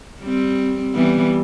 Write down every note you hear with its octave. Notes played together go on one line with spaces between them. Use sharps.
G3 C4
E3 G3 B3